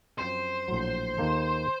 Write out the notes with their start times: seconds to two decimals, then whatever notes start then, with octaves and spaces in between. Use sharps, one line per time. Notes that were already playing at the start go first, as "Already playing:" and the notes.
0.19 F#2 F3 C4 C5
0.68 A#1 A2 F#3
1.18 D#2 D#3 A#3 F4 A4